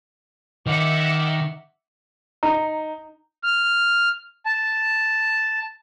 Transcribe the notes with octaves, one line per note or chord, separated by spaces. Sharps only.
D#3 D#4 E5 F#5 D6
D#4 A#5
F6
A5